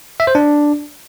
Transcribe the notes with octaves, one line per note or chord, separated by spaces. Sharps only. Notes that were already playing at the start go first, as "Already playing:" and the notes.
E5
C5
D4